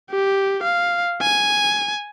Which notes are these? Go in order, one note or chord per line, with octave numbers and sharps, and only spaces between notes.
G4
F5
G#5